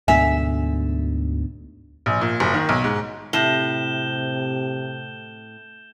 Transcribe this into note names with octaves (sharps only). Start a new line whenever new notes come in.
D2 G#2 B2 D3 E5 G#5
A#1
A#2
F#1
D#3
B1
G#2
A2 C3 G6 E7 G7